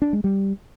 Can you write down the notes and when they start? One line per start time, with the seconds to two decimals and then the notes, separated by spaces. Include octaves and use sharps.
0.02 D4
0.13 G#3
0.24 G3